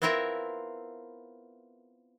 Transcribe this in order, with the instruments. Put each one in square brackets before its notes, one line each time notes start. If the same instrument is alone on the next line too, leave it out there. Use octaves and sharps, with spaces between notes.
[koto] B3 C4 E4 F4 A#4 E5